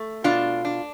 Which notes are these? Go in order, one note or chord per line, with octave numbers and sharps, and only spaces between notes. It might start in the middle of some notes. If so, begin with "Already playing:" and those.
Already playing: A3
B2 D4 F4
D4